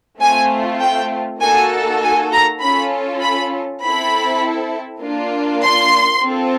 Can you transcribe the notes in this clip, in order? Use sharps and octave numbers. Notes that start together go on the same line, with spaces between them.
A3 C4 F4 G#5
G5
A#3 D#4 F#4 A4 G#5
G#5
A#5
C#4 F4 A4 B5
B5
C4 E4 A4 B5
A#3 D4 F4
C6
C4 F4 A4